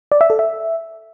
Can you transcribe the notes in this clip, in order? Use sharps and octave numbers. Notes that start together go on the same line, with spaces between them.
D5
E5
A4
E5